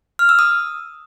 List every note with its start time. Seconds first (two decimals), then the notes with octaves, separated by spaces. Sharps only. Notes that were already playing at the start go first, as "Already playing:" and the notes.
0.19 F6
0.29 E6
0.39 D#6